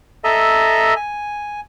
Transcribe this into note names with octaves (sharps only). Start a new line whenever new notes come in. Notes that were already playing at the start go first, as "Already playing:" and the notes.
A4 D#5 E5 A#5
G#5